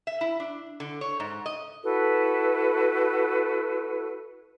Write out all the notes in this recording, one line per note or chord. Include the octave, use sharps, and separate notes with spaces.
E5
E4
D4
D3
C#5
G#2
D#5
E4 F#4 A4 B4